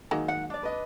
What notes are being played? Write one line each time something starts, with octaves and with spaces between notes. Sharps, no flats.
D#3 F#3 G#3 A#3
F#5
D4 D5
B4 D#5